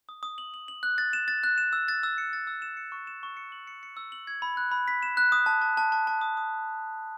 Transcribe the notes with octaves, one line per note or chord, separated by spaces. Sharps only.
D#6
D#6
F#7
F#7
F#7
F#6
A6
E7
A6
F#6
E7
E6
A6
E6
C#7
A6
E6
E7
C#7
C#6
E7
C#6
C#7
F#7
C#7
C#7
E6
F#7
G#6
B5
F#6
B5
B6
E7
F#6
D#6
A5
A5
A5
A5
A5
D#6
D#6